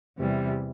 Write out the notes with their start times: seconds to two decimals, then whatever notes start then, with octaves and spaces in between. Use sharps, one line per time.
0.18 E2 C3 E3 G3